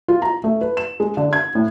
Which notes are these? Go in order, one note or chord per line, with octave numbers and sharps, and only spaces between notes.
F4
A#5
A3
B4
E7
G#3
D3
G#6
A2